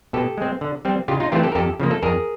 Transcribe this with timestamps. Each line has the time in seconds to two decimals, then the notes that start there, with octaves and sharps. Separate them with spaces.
0.13 B2 G4 A4
0.38 G#3 C4
0.61 D3
0.85 G3 C4
1.08 C#3 F4 G4
1.20 D#4 F4
1.32 E3 A3 C4 F4 G4
1.43 G4 A4
1.52 A#4
1.55 F2 G4 A4
1.80 C#3 F3 A#3
1.91 A4
2.02 F2 G#4 A#4